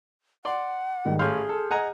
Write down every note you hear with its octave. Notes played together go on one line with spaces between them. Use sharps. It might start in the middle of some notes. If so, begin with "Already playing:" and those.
D5 F#5 C6
G#2 D#3 G3
A1 G#4 C#5 F5 C6 F6 G6
A4
D#5 F#5 G#5 A#5